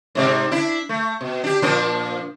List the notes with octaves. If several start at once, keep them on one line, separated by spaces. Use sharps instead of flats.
G#2 C3 D5
D4 E4
A3
B2
D4 G4
A#2 F3 D4